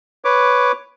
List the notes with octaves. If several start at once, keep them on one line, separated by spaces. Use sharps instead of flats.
B4 C#5 D6